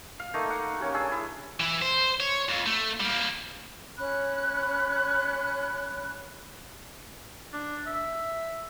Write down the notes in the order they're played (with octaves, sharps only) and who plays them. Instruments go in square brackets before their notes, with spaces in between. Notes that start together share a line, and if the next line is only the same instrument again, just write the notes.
[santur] F5
A3 A#3 D#4 D#5
F#5
A#3 C#4 G4
D4 G#4 G#5 E6
E4
[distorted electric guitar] E3 E4
C5
C#5
F2
A3
G3 A#3
[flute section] C#4 B5 F#6
[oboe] D4
E5